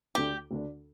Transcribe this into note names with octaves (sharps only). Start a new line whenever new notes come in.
D2 D3 A3 D4 G4
D2 D3 A3 D4